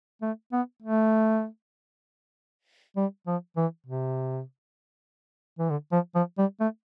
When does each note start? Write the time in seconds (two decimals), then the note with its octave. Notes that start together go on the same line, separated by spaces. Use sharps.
0.22 A3
0.53 B3
0.83 A3
2.97 G3
3.27 F3
3.57 E3
3.87 C3
5.59 E3
5.70 D3
5.92 F3
6.15 F3
6.39 G3
6.61 A3